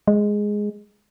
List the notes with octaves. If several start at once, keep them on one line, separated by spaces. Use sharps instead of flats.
G#3